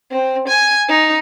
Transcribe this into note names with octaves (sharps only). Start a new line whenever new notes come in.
C4
G#5
D#4